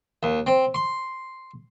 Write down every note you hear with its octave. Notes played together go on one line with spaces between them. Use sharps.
D#2
C4
C6